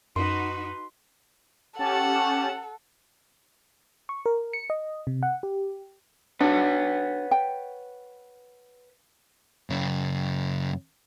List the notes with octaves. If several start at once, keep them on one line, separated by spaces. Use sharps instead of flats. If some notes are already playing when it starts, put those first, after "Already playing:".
F#2 D#4 F#4 B4 C6
C#4 G4 A4 F#5 A5
C#6
A#4
C#7
D#5
C3
F#5
G4
D4 F#4 B4 C#5 F#5
G5
F#2 C#3